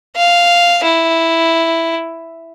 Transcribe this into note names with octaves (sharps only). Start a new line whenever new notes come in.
F5
E4